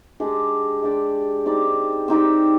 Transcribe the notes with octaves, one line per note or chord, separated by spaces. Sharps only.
G#3 D4 G4 D5
G#3 D4 G4 D5
C4 D#4 G4 D5
C4 D#4 G4 D5